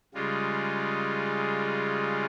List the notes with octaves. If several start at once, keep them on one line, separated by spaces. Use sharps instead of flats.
C#3 G3 G#3 F4